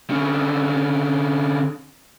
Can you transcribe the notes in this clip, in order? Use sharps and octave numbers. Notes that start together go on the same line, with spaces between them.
D3 C#4